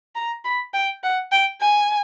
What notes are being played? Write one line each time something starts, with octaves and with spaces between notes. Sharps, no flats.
A#5
B5
G5
F#5
G5
G#5